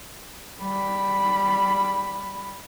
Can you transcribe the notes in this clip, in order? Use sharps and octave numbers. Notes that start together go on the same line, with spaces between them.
G3 B5